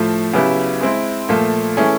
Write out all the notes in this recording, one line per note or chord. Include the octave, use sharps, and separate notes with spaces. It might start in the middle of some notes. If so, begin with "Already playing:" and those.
Already playing: A2 F3 A3
C#3 F#3 B3 E4 G4
G#3 C4 E4
A#2 F3 A3
E3 A3 C#4 E4 G#4